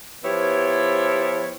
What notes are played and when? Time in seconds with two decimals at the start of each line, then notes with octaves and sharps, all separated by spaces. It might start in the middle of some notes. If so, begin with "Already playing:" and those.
0.24 F3 B3 E4 G4 C#5